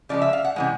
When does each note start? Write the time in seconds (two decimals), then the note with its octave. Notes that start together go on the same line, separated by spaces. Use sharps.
0.09 C#3 F3 G#3 D5
0.22 E5
0.33 F5
0.44 F#5
0.56 C3 E3 G#3